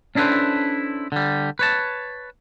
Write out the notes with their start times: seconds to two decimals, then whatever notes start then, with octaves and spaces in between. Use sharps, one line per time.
0.15 C#4 D4 E4 A4 B4 C5
1.12 D3 G3
1.59 B4 C#5 A5